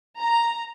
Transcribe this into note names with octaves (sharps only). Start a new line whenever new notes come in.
A#5